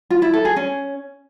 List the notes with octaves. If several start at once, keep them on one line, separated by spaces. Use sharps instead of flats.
F4
E4
A4
G#4
C#4